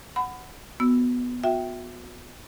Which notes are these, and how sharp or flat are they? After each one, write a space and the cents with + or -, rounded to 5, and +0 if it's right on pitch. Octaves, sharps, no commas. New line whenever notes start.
F#5 +0 B5 +25
B3 +0 F#4 -10 E6 +0
F#4 -35 E5 +0 G5 -10